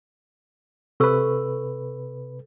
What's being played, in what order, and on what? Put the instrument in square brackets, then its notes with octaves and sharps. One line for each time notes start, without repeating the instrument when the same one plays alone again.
[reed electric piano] C3 B4 [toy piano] A4 C#6 E6